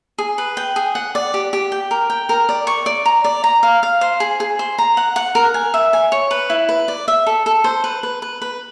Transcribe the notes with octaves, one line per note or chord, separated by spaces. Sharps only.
G#4
B4
G5
G#4
F#5
D5
G4
G4
G5
A#4
G5
A#4
D5
C#6
D5
A#5
D5
A#5
F5
F5
C5
G#4
G#4
C5
A#5
F#5
F#5
A#4
G#5
E5
G#5
C#5
B4
E4
B4
D5
E5
A4
A4
C5
B4
B4
B4
B4